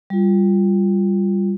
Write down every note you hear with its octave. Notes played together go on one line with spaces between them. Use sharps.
G3 F4